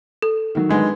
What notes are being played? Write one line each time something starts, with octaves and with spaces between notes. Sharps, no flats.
A4
D#3 F#3
D3 G#3 B3